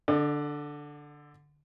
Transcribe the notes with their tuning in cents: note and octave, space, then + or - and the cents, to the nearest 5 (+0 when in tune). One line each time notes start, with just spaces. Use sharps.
D3 +0 D5 +40